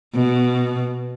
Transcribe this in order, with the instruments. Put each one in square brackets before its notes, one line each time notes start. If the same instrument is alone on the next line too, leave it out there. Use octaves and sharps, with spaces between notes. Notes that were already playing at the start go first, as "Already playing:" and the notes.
[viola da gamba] B2